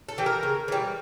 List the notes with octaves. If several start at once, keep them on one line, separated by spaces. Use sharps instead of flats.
A4
E3 G3
A#4
C#3
E3 G3